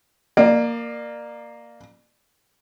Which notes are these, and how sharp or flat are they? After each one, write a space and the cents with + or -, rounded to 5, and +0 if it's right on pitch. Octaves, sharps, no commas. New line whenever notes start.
A#3 +0 D5 +30